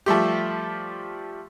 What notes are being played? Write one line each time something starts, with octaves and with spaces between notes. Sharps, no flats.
F3 G3 A3 G4